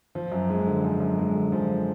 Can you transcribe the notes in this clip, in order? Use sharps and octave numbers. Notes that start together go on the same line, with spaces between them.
F3
F#2
G#3
D3
F3
F#2
G#3
D3
F3